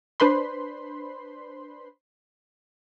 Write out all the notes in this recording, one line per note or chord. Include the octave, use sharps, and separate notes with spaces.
D4 B4 C5 B5 C6